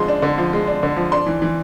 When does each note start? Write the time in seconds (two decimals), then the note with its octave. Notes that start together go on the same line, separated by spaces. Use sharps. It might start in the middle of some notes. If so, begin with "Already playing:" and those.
Already playing: D3 F3 G#3 C6
0.08 D4
0.22 D3
0.38 F3
0.53 G#3
0.68 D4
0.83 D3
0.96 F3
1.12 D4 C6
1.27 E3
1.42 E3